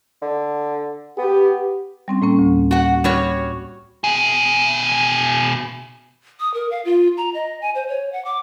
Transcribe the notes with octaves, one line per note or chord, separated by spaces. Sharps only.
D3
B3 G4
G3 C4 C#4
A2 A#3 C#4
D2
F#4 F#5
G3 F#4 C#5
B2 G#4
D#6
A#4
F5
F4
A#5
D#5
G#5
C5
C#5
F#5
D6